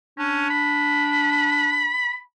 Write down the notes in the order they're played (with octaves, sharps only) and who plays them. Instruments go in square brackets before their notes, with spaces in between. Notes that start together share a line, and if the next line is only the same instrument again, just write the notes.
[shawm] C#4 [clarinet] D4
[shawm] B5